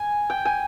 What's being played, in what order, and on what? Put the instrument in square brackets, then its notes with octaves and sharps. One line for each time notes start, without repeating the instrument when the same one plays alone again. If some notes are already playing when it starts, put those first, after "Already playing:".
Already playing: [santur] G#5
G5
G#5